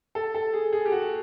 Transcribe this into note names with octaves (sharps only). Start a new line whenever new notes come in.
A4
A4
G#4
G#4
G4
F#4